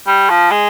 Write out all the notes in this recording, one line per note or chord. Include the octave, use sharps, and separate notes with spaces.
G3
F3
G#3